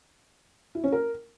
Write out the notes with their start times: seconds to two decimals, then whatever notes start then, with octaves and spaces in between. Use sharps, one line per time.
0.75 E4
0.84 C#4
0.92 A#4